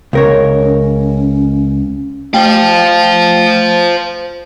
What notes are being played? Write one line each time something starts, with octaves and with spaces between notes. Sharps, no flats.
C#2 C#4 A#4 C#5
A3 C5 F5 G5